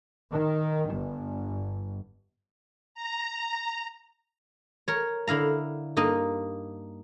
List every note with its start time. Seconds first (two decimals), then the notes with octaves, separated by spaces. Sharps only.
0.32 D#3
0.90 G1
2.95 A#5
4.88 A#4 C#5
5.27 D3 E4 F5 A#5
5.97 G2 A#3 D#4 D#5